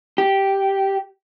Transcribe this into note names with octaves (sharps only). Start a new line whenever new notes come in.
G4